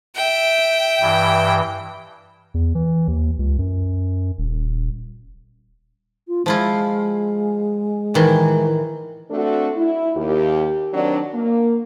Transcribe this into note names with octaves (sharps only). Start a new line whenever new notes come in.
E5 G5
G2 E3
E2
E3
D#2
C#2
F#2
D#1
F4
F3 G#3 E4 F4
A2 D#3 E3
A3 C4 D4 F#4 A4
E4
D#2 G4
D#3 F#3 C4 D4
A#3